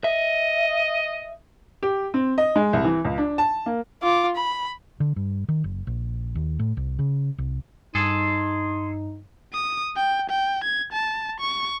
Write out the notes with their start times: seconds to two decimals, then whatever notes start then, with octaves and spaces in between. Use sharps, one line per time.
0.04 D#5 E5
1.83 G4
2.14 C4
2.38 D#5
2.56 G#3
2.73 C2
2.85 E3
3.05 C#2
3.18 D4
3.38 A5
3.66 A#3
4.02 F4 D6
4.36 B5
5.00 D3
5.16 G2
5.49 D#3
5.64 F#1
5.87 A#1
6.35 D#2
6.59 A2
6.77 C2
6.99 C#3
7.38 C2
7.95 G2 D#4 G#4 A4 C6
9.53 D#6
9.96 G5
10.30 G5
10.64 G#6
10.93 A5
11.40 C#6